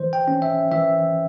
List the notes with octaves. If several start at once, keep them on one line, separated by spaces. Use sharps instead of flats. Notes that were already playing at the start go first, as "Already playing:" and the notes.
Already playing: E3 C5
G5
C#4
E5
E3 E5